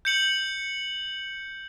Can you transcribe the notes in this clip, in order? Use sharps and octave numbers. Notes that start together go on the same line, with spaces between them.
G6 C#7 F#7